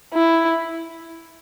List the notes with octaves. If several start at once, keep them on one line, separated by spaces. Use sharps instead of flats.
E4